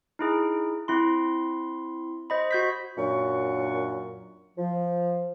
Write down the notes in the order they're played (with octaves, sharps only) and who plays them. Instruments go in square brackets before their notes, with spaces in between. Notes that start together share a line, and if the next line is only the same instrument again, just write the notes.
[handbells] D#4 E4 G#4
C4 E4 C6
C5 D#5 B5
F#4 G6 B6
[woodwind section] F#2 A#2 F#3 D4 C#6
F3